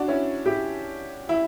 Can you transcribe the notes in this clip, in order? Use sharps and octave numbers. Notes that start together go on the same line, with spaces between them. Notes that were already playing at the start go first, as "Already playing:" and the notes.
Already playing: D4 F#4
C#4 E4
E4 G4
E4